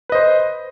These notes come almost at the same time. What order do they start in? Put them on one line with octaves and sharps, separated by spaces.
B4 D#5 C5